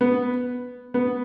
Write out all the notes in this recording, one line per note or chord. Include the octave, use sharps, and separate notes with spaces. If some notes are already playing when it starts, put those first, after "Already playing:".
B3
B3